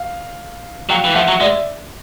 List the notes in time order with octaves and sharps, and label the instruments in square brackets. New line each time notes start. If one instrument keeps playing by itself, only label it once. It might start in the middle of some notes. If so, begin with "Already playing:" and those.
Already playing: [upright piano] F5
[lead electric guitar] F#3 [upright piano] F5 G5
[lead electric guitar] E3
[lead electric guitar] F3 [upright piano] E5 F#5
[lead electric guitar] F#3
[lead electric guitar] G#3 [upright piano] D5 E5